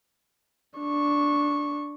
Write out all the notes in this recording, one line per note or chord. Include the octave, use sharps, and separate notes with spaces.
D4 C#6